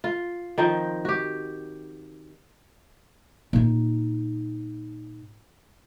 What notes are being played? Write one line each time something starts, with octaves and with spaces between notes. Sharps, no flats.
F4
D#3 F3 C4 G5
F#4 G4
A#2 D#4